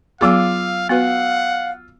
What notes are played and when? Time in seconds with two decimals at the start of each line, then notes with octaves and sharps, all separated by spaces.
0.21 F#3 B3 F4 G#4 F5 D6 E6
0.89 B3 F#4 B4 F5 F#5